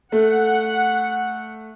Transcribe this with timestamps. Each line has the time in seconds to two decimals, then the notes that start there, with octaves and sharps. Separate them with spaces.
0.12 A3 F#5